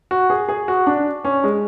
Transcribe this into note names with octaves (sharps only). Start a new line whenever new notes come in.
F#4
G#4
G#4
F#4
D4
C#4
G#3